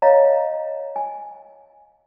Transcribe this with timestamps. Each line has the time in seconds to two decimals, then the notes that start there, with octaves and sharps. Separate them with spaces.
0.02 C#5 D#5 F5 A#5
0.96 G#5